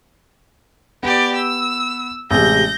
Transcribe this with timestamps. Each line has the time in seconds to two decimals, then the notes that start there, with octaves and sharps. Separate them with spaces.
1.03 B3 G4 D5
1.36 E6
2.31 A1 C3 G#3 G6 A#6